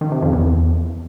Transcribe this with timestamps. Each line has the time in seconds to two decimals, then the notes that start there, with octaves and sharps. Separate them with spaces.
0.01 D#3
0.12 C3
0.22 F2
0.33 E2